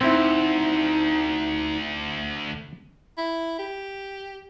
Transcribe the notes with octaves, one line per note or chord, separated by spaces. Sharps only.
D2 C4 D#4 E4
E4
G4